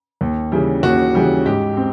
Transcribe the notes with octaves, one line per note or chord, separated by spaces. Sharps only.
D#2
C#3 E3 G3
D#2 F#4
C#3 E3 G3
G#2 G4
C4